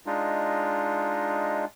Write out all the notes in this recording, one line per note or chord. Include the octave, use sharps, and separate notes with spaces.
G#3 D4 D#4 F4